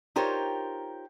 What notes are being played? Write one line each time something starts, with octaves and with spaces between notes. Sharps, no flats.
D#4 F4 G4 A#4 C5 C#5